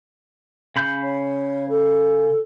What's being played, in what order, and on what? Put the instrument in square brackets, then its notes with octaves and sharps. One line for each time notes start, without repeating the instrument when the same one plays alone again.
[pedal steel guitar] C#3 B5 G6
[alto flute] C#5
A4